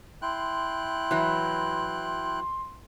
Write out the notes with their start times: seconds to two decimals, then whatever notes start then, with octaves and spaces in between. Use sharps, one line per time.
0.22 E4 G5 C6 F#6
1.11 E3 F#3